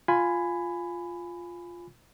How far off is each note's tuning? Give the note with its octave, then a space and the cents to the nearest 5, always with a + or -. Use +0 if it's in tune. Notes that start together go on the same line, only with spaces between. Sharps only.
F4 +0 G#5 +0 B5 +20